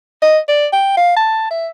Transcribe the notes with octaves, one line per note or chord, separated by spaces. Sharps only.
D#5
D5
G5
F5
A5
E5